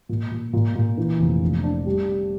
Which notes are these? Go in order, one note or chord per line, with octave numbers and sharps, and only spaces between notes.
A#2
A#2
A#2
A#2
E3
F1
A#1
D4
G3